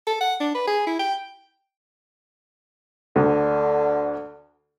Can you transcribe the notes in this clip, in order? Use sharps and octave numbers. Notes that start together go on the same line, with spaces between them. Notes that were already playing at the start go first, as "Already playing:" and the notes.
A4
F#5
D4
B4
G#4
E4
G5
D2 D3